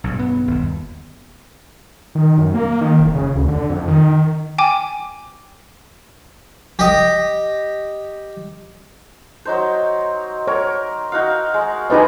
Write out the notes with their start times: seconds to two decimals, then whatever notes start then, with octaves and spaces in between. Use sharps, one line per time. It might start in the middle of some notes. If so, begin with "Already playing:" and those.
0.04 B1 G2 C#3
0.19 B3
0.48 G1 D#2
2.15 D#3
2.38 F#2
2.54 A#3
2.81 D#3
3.00 F1
3.15 C#3
3.35 D2
3.48 D3
3.70 F2
3.88 D#3
4.58 G5 G#5 D6
6.79 G4 D#5
9.45 F#3 D#4 C5
10.47 A#4 C#5
11.12 D#4 F#4 F5
11.54 G#3
11.90 D#4 F4 G4 G#4 B4 D#5